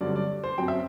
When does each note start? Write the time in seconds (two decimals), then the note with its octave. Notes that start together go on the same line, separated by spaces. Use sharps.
0.01 G2 D3 F#3 C4 D5
0.16 D5
0.44 C5
0.58 F#2 F#3 C4 G5
0.68 E5